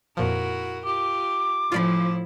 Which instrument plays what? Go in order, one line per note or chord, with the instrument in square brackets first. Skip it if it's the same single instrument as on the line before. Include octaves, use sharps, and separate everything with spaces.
[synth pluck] F2 A#2 F3 [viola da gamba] E4 F#4 A#4
[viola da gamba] F4 G4 [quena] D6
[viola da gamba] A2 E4 [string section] F3 [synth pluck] F4 D5 B5